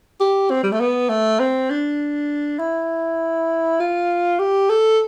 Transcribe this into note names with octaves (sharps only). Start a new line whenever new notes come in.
G4
C4
G3
A3
B3
A3
C4
D4
E4
F4
G4
A4